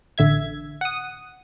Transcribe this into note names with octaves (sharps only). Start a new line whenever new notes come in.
A1 D3 E5 G#6
F#5 D#6